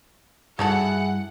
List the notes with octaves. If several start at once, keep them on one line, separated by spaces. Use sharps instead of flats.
G2 F#3 G3 D#4 E4 G#4 A4 F#5